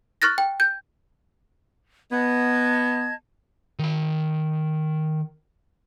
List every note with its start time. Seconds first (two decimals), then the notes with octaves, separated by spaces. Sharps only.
0.22 C#6 F6 F#6 A6 A#6
0.38 G5
0.60 G6
2.11 B3 D#5 A5 G#6
3.79 D#3 B5